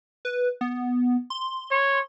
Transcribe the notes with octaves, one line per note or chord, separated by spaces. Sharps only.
B4
B3
C6
C#5